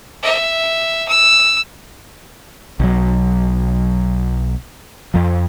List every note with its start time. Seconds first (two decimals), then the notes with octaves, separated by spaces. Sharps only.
0.23 E5
1.08 E6
2.80 B1 F#3
5.14 F2 F3